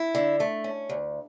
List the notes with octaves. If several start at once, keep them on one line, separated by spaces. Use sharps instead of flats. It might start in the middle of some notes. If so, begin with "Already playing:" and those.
Already playing: E4
D3
A3
C#4
D2